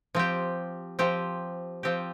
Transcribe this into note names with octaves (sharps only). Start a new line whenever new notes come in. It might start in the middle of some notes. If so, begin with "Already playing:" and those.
F3 C4 G4
F3 C4 G4
F3 C4 G4